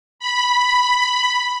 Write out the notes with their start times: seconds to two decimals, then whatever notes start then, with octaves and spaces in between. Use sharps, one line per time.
0.19 B5